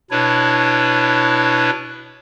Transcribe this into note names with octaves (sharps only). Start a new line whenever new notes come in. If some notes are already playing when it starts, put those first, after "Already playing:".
B2 D4 E4 B4 C#5